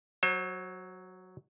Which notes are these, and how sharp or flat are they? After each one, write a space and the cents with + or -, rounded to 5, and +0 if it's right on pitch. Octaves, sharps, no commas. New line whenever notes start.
F#3 +0 C5 +40